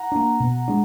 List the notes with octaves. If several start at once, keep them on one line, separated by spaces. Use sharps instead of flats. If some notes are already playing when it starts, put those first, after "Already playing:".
Already playing: F#5 A#5
A#3 D4
B2
G#3 D4